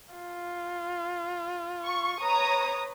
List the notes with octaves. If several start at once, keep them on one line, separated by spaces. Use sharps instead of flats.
F4
C#6
B4 C#5 A#5 D#6